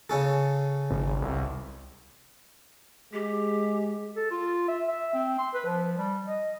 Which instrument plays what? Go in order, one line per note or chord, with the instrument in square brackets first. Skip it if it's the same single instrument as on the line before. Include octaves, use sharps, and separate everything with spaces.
[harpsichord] C#3 C#4 A4
[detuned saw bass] G#1
C2
[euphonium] G#3 [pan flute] G4
[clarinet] A4
F4
E5
E5
C4
C6
B4
F3
G3
D#5